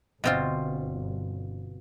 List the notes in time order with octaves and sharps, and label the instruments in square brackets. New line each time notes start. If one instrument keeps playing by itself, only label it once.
[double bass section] G1 [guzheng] B2 C4 F4